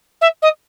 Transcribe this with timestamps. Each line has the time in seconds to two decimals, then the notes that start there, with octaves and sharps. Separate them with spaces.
0.21 E5
0.42 D#5